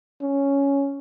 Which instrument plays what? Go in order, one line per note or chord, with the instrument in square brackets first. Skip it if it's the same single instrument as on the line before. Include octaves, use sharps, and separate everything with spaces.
[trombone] C#4